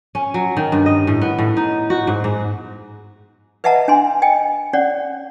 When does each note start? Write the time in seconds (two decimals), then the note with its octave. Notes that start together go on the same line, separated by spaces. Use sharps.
0.15 C#4
0.34 F#3
0.57 D#3
0.72 G2
0.86 D#5
1.07 A2
1.21 B3
1.39 A2
1.57 D#4
1.90 F#4
2.07 G#2
2.24 G#2
3.64 B4 D#5 E5 F#5 A5 A#5
3.88 D4 G#5 C6
4.22 D#5 G5 G#5
4.73 C#4 C#5 D5 F#5